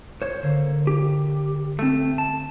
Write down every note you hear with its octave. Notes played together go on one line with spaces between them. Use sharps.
C5 C#5
D3 A#3
G4
A3 C4
A5